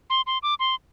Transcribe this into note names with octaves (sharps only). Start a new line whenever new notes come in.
C6
C6
D6
C6